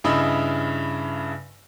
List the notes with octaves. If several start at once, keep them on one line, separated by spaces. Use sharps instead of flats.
G2 C#3 E4 D#5 E5 B5